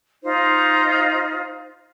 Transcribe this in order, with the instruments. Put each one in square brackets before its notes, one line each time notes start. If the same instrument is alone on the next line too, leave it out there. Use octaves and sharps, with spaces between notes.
[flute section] D#4 F4 C5